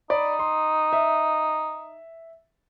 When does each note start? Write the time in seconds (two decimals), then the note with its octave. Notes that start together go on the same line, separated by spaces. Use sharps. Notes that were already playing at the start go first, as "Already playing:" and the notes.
0.10 D#4 D5 B5
0.39 C6
0.93 E5